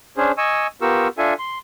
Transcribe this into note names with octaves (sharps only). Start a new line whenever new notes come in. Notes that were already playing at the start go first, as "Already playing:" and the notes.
C#4 D4 G#4 C5
D#5 G#5 C#6 E6
B3 F4 G4 A#4 C#6 E6
D4 F4 A4 E5 G#5
C6